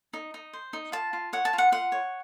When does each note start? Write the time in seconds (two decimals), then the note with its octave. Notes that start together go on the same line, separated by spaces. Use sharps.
0.13 D#4
0.34 D#4
0.53 C5
0.73 D#4
0.92 F4 A5
1.13 F4
1.33 C#5 F#5
1.45 A5
1.53 F4
1.58 F#5
1.72 F4 F#5
1.92 C#5